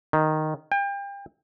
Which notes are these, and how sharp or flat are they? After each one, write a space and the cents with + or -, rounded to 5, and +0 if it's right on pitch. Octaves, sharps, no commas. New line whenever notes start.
D#3 -5
G5 +35